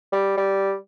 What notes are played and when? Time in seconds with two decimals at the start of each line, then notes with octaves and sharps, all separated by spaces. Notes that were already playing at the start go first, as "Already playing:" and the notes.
0.12 G3
0.37 G3